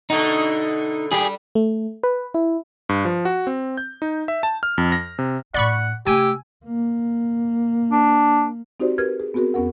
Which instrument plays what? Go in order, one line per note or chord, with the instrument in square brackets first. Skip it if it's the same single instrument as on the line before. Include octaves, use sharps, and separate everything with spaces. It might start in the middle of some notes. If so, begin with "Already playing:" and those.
[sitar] B2 D3 A3 [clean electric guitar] D#4
[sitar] G3 [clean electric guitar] G4 G#4
[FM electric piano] A3
B4
E4
[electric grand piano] G2
F3
F#4
C4
G6
D#4
E5
A5
F6
F2
A#6
C3
[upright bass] A2 D4 [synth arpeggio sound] D5 B5 C#6 [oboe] F#5
[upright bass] C3 A3 [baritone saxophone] G4 [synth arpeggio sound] G#5 [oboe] E6
[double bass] A#3
[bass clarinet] D4
[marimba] C4 D#4 F#4 G4 C5 D5
G4 A#4 B4 F6 G#6
G#4
B3 C4 F#4 G#4 A#4
E2 B3 C#4 A#4 F#5